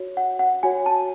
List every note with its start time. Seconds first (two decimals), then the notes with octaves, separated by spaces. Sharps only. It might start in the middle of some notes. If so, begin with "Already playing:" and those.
Already playing: F#4 C#5
0.17 F#5
0.39 F#5
0.63 F#4 C#5 G#5
0.86 A5